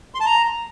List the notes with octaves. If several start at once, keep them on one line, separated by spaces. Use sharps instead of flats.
C6
A5
A#5